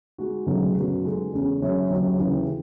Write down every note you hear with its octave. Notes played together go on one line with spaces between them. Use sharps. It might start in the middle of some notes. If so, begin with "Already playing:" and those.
G#3 D#4 F#4
C#2 B2 F#3 A3 D#4
F#2 C#3 F#3 B3 F#4
G#3 D#4 A4
E2 C#3 G#3 C#4
F#3 C#4 G#4 C#5 E5
D#2 C#3 F#3
D#2 C#3 E3